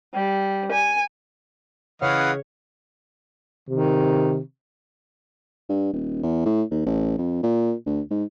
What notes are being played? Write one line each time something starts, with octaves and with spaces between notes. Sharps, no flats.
G3
G#5
C#3 E3 B4 C#5 D#5 F5 F#5 F6
C3 D#3
G2
D#1
E2
A2
D#2
A1
F2
A#2
D2
G#2